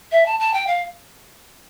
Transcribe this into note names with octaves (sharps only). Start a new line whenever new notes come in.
E5
A5
A5
G5
F5